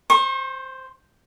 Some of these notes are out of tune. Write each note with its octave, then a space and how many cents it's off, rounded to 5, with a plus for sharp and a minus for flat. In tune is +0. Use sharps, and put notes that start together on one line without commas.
C5 +0 C#6 -45